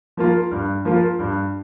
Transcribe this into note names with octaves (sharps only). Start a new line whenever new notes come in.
F3 A#3 F4
G2
F3 A#3 F4
G2